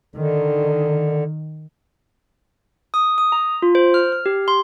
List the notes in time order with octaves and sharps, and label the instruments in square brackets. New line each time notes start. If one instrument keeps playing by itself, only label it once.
[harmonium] D3 [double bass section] D#3
[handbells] D#6
D#6
A#5
F4
C5
F6
F6
G4
C6